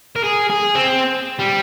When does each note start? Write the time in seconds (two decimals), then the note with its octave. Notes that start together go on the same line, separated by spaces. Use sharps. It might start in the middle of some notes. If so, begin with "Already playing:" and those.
0.16 A#4
0.24 G#4
0.50 G#4
0.75 C4
1.40 G3